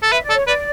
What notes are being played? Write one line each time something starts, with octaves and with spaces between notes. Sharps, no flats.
A4
B4 E5
D5
A4
C#5
B4 D5